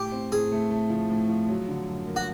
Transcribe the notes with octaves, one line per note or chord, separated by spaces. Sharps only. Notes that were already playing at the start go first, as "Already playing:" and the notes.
Already playing: A2 G4
C4
A2 G#4
A3
A3
F3
A2
F3
F#3
D3
F#2
A#3
F#4